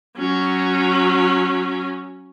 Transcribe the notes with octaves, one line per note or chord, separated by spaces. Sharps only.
F#3 C#4